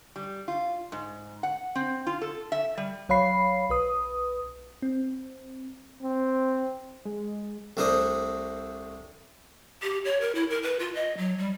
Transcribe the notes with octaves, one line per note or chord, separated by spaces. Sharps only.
G3
F4
G#2
F#5
C4
F4
A4
E5
G3
B1 F#3 C#5 F5 B5 C7
B1 B4 D#6
C4
C4
G#3
C2 A3 D4 A#4 C5 D#6
G4
C#5
A#4
E4
A#4
B4
F4
D#5
F#3
G3